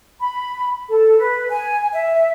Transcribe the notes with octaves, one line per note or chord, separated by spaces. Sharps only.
B5
A4
B4
G#5
E5